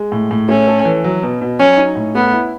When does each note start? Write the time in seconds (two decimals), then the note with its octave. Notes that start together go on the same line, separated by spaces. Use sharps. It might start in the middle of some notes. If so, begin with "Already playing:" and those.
Already playing: G#3
0.12 A2
0.31 A2
0.49 A3 C#4
0.68 A4
0.85 E3
1.04 F#3
1.23 B2
1.41 B2
1.59 F#3 C#4
1.77 D#4
1.96 A2
2.15 A3 B3
2.33 E4